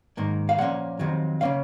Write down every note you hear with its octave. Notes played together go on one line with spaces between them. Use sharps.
G#2 D#3 A#3
F5
A#2 F3 A#3 C#4 F#5
F2 C3 D#3 F#3
C#3 F3 A#3 C#4 F5